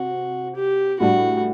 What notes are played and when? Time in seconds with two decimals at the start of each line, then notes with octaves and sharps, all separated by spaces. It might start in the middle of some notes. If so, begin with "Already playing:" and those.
Already playing: C3 C4 F#4
0.56 G4
1.00 A2 G3 D4 F#4